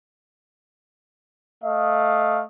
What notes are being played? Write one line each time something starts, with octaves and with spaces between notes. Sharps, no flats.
A3 D#5 F5